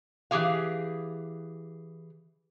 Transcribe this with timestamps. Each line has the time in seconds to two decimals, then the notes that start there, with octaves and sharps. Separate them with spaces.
0.31 E3 C4 G4 G#4 F5